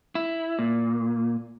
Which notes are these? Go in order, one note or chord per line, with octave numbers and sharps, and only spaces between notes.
E4
A#2